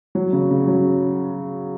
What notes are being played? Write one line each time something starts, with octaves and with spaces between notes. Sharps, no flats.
F#3
C#3
C#3
F#3